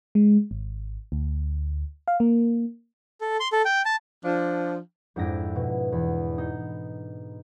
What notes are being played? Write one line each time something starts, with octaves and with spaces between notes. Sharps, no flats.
G#3
G#1
D2
F5
A#3
A4
C6
A4
G5
A5
F3 D4
F2 G#2 D4 E4 A#6 D7
B2
E2
D#4